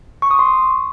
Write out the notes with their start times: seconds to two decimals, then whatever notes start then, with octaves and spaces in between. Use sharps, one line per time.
0.22 C#6
0.31 D#6
0.39 C6